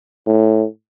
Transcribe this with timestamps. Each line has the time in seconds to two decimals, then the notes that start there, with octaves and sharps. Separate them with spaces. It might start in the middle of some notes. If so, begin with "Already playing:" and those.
0.26 A2